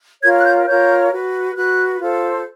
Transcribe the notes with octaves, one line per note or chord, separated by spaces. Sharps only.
F4 A#4 C#5 G#6
F#6
G6
F4 A#4 C#5 G6
F#4 B4
F#4 B4 F#6
F4 A4 C5